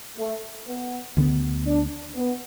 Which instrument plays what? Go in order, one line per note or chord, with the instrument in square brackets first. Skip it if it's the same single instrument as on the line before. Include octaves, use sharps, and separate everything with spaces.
[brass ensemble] A3
B3
[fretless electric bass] D2 D3 B3
[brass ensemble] D4
B3